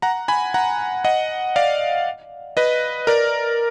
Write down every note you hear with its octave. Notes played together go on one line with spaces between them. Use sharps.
F#5 A#5
G#5 B5
F#5 A#5
D#5 F#5
D5 F5
B4 D#5
A#4 D5